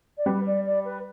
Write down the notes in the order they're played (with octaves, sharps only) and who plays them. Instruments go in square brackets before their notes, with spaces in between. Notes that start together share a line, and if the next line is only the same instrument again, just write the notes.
[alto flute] D5
[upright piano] G3 [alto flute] B4
[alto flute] D5
D5
B4